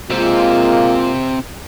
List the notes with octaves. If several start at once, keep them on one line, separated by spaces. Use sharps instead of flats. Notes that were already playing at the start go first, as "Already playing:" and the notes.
C3 G#3 A#3 C4 F4